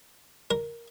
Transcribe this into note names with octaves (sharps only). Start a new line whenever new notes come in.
A#4